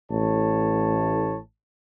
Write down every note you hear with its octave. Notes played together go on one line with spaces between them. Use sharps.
A1 A2 C#5 A5